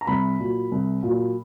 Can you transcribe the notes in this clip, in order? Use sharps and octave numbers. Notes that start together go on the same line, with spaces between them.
A#5
C2 B5
A#2 F#3
C2
A#2 F#3